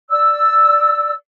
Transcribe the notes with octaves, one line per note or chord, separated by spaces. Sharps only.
D5 E6